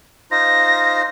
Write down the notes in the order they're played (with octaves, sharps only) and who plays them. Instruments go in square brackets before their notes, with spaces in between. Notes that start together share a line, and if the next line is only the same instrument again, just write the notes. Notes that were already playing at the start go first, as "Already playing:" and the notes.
[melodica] D#4 F4 C5 [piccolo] A#6